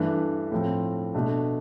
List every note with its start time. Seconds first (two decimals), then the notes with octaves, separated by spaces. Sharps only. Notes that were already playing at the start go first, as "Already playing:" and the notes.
Already playing: G2 E3 A3 D4
0.52 A2 F3 C4
1.14 B2 A3 D4